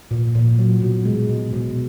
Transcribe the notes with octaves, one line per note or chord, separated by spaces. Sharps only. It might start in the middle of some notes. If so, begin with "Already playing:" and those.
A#2
A#2
F#3
B2
G#3
B2
B2